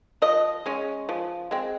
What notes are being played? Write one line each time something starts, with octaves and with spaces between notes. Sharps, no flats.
F3 D#5
G#3 C#4
F3
G#3 C4